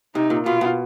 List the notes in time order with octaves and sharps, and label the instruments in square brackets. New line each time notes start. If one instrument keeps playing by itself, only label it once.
[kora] C3 [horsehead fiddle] D#4
[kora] A#2
[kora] B2 [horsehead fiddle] F4
[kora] B2